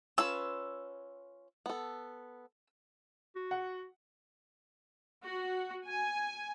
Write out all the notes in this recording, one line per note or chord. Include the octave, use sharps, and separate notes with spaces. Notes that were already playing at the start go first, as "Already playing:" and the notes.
C#4 F4 B4 E6
B3 A4
F#4
F#5
F#4
G#5